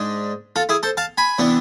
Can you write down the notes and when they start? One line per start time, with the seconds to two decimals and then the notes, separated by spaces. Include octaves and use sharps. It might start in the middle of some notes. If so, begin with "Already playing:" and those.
Already playing: G#2 G#3 D4
0.56 F4 A4
0.69 E4 G#4
0.83 A4 C5
0.97 F5 A5
1.18 G#5 B5
1.38 C3 E3 B3 D4